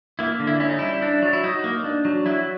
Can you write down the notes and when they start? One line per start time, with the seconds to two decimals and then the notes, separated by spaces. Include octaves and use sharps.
0.19 A#3 E4
0.40 D3
0.47 E4
0.60 C#4 E4
0.69 D#4
0.79 G3 E4
1.02 D4
1.22 F#3
1.33 E4
1.44 F#3 D#4
1.64 A#3
1.84 D4
2.05 F#3
2.26 F#3 E4